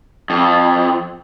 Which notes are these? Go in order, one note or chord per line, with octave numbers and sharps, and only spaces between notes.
F2